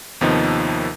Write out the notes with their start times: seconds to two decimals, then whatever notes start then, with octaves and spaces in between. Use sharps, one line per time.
0.21 D#2 C3 D#3 F3 B3 D#4